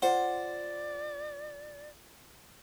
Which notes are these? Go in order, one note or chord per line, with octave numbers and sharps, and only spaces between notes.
F4 C5 D5 F#5